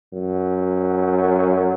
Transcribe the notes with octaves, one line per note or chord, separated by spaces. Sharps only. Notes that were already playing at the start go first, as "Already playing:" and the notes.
F#2